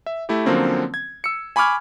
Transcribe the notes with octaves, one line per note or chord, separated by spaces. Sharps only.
E5
A3 E4 G4
D3 F3 F#3 A#3 C4 C#4
G#6
E6 C#7
G#5 B5 C#6 D6 F6 G#6